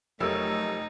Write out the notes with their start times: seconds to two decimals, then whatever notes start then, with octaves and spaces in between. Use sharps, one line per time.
0.20 F1 F#3 A3 D#4 G4 A#4 C#5 E6